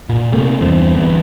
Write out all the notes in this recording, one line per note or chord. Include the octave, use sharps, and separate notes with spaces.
A#2
C3 A3 A#3
E2 G2 E3 C4
G1 E3 B3